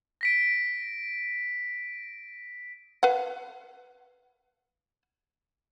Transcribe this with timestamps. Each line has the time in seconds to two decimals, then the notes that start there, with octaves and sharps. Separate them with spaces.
0.21 A#6 B6 D7
3.03 B4 F5 F#5